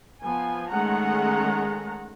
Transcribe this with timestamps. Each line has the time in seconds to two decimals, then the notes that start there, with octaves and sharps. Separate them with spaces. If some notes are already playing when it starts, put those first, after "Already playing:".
0.21 F3 B3 G#5
0.70 D#3 G#3 A3 C#4 F#5 A#5